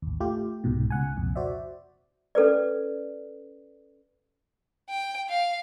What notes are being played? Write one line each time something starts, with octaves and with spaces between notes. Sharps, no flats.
A1 D#2
A3 F4 G4
C2 G#2 B2
C#2 F#5 G#5
C2 F2 A#2
F#4 C5 D5 E5
C#4 A4 B4 D5
G5
F5